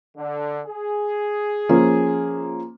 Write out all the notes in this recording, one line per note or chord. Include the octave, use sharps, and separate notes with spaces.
D3
G#4
F3 A#3 C#4